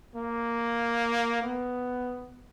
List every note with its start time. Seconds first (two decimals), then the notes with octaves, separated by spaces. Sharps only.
0.16 A#3
1.42 B3